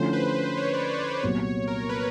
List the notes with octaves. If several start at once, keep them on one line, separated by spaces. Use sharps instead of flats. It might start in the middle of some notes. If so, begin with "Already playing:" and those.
Already playing: D3 F3 A3 C#4 E4 C5
B4
C5
C#5
D5
D5
C#5
C2 A#2 F#3 B3 C#5
A#4
B4